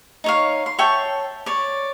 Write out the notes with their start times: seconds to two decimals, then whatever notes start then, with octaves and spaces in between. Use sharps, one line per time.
0.24 D#4 C#5 F5
0.66 C6
0.78 C#5 E5 G5 A5
1.46 C#5 D5